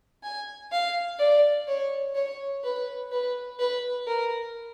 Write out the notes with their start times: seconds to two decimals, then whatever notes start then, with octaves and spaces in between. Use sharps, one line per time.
0.23 G#5
0.72 F5
1.19 D5
1.68 C#5
2.15 C#5
2.64 B4
3.12 B4
3.59 B4
4.07 A#4